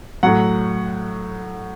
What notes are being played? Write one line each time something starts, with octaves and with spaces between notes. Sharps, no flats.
A2 F#3 F#5